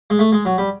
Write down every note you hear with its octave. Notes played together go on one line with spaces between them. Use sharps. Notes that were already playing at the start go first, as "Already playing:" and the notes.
G#3
A3
G#3
F#3
G3